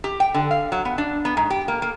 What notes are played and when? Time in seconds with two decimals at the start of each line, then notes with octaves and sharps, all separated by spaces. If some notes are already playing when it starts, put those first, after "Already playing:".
0.04 G4
0.20 G5
0.34 D3
0.51 F5
0.72 F#3
0.85 B3
0.98 D4
1.25 B3
1.37 G#2
1.50 G4
1.68 A#3
1.82 A#3